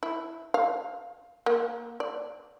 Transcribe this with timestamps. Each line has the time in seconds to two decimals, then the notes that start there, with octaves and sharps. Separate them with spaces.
0.03 E4
0.54 F5
1.46 A#3
2.00 D5